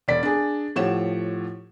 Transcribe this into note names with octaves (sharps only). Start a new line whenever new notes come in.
E1 D5 B6
D4 G#4
A2 F3 G4 C#5 F#5 E7